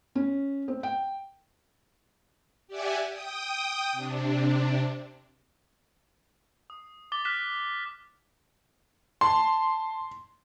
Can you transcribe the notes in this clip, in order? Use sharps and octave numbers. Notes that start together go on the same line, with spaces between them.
C#4
C4
G5
G4 D5 E5 F#5 G#5
G5 D#6
C3 D4
D#6
D6 A6 G7
F6 F#6 B6 E7
A5 C6